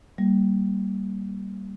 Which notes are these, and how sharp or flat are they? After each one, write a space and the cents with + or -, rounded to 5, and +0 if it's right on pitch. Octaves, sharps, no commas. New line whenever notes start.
G3 -10 A#3 +0